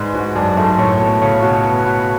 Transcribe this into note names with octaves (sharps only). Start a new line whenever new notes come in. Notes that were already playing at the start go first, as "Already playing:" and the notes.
Already playing: G#2 G#4 B4 D5
G#2 F#4
F#2 D4
G#2 A3
A2 C#5
B2 A4
C#3 C#5
B2 F#4
B4
F#4